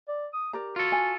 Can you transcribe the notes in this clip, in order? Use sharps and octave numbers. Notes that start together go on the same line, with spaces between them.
D5
D#6
G4 A#4 D5 A#5
F4 F#4 A4
G#5